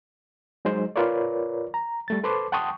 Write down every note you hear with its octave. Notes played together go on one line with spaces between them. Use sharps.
F#3 G#3 D#4 C5
F4 A#4 B4 C#5 D5
A#5
G3 A3 A6
A4 B4 C5 A5 C6 D6
F#5 G5 A5 C6 C#6 D#6